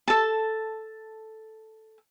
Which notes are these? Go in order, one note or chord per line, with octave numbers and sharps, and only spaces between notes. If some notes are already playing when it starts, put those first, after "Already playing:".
A4 A5